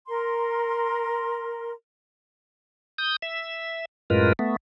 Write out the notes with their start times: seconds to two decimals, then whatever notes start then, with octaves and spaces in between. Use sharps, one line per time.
0.08 A#4 C6
2.98 D#6 G6
3.22 E5
4.10 F#2 A2 G#3 F4 A#4 B4
4.39 A3 B3